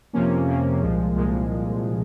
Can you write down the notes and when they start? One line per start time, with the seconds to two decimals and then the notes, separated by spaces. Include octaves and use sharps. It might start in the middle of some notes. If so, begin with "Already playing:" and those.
0.13 F2 C3 F3 A#3 C#4
0.47 F2 C3 F3 A#3 C#4
0.81 C2 A#2 F3 G#3
1.15 C2 A#2 F3 G#3